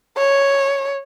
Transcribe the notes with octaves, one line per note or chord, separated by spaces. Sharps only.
C#5